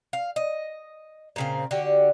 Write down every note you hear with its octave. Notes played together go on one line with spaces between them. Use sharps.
F5
D#5
A#2 C#3 C4
D3 F#4 G4